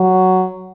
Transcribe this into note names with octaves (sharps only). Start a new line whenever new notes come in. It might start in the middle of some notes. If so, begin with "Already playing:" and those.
Already playing: F#3